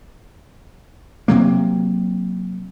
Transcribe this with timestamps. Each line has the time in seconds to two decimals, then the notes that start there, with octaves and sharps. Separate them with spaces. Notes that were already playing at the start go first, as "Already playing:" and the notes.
1.28 C3 F#3 A#3